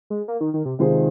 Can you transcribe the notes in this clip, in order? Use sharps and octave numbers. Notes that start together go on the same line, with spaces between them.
G#3
A#3
D#3
D#3
C3
C3 D#3 G#3 F4 G#4 C5